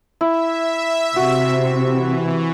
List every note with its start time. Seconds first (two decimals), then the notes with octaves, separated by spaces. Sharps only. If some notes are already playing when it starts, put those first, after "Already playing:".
0.21 E4 E5
1.16 C3 F#4
1.83 E3